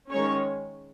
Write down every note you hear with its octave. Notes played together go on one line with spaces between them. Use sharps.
D#3 G#3 C#4 C#5